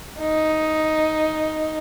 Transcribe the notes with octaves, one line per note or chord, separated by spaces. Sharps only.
D#4